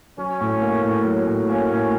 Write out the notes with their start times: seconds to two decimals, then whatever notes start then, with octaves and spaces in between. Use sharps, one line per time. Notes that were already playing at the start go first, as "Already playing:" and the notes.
0.18 F#3 C#4
0.41 A2
0.62 A#3
0.83 A2
1.05 F#3
1.27 A2
1.49 A#3 C#4
1.70 A2